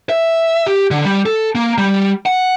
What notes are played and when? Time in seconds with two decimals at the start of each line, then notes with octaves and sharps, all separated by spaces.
0.09 E5
0.67 G4
0.91 D3
1.05 G3
1.26 A4
1.55 A#3
1.78 G3
2.26 F#5